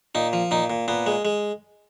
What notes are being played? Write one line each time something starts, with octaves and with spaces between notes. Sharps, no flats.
A#2 D#4
F3
A#2 D#4
A#2
A#2 B3
G#3
G#3